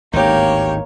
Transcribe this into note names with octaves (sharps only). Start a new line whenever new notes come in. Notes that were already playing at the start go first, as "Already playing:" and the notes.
G#1 D2 A2 A#3 D#4 G4 C#5